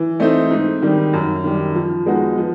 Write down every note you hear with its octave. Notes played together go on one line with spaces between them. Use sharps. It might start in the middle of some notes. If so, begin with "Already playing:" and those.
Already playing: E3
A3 C4 D#4
G#2
D#3 G3
F#2
D#3 G3
F3
G#3 B3 D#4 F#4
F3